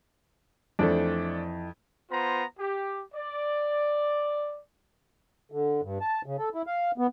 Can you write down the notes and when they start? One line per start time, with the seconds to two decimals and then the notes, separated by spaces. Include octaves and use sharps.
0.79 F2 E3 A3 D4 C5
2.10 B3 F4 C5 A#5
2.58 G4
3.14 D5
5.52 D3
5.83 G2
6.01 A5
6.26 C#3
6.38 A4
6.55 E4
6.67 F5
6.98 B3